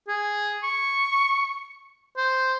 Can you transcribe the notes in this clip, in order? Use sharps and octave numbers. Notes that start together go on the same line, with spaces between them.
G#4
C#6
C5